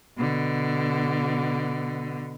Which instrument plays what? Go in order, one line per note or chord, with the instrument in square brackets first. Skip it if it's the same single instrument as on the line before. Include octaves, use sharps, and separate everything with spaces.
[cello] B2 D3